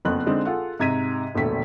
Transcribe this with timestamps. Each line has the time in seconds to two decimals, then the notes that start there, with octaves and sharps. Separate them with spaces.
0.05 F#1 F2 B3 F#6
0.26 D3 G#3 C4 D4 D#4
0.45 F4 G#4 A4 F#5
0.79 G#2 C3 A#5 G#6 B6 D#7
1.35 E1 A#1 D3 A3 B6